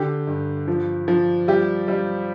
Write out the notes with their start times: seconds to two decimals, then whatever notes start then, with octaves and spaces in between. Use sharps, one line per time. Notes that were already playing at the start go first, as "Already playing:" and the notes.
Already playing: D3 G4
0.27 G2
0.68 F3
1.08 F3
1.48 G3 G4
1.88 G3